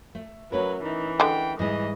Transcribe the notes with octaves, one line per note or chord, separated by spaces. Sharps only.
A3
F#3 A3 C#4 A#4 B4
E3 D#4
D3 G#3 G5
G#2 E3 G3 G#4 D#5